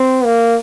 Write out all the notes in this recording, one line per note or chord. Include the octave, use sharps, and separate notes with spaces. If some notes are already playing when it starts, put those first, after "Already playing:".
Already playing: C4
A#3